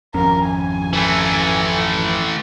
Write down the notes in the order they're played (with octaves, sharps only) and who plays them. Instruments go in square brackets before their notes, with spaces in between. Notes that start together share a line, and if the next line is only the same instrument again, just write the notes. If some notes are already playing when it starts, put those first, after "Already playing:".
[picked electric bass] G#1 F2 C#4 [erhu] A#4
[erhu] G#5
[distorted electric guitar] E3 A3